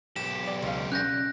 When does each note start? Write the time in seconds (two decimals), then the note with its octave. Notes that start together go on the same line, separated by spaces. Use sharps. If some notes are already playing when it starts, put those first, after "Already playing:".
0.16 B1 G4 E7
0.47 D5
0.62 C#2 F5
0.92 C#4 F#6 G6 A#6